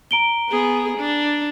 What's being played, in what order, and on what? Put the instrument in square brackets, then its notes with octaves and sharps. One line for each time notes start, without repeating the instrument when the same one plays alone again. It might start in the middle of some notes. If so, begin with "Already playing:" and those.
[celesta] A#5 D7 G7
[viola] B3 G#4
D4